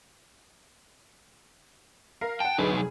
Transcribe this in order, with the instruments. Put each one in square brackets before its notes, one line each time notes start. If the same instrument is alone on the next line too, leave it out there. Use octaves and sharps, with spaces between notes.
[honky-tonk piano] A#4 F5
[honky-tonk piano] F#5 A5 [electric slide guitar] G5
[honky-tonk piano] D2 G#4 B4 [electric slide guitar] F#3 D#4
[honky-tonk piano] F1 G#4